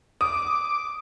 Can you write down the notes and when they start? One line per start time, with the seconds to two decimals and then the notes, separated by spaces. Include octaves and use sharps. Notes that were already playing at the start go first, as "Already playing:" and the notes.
0.21 D6 D#6